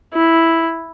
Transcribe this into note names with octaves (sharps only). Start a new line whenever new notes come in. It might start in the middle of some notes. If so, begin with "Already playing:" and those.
E4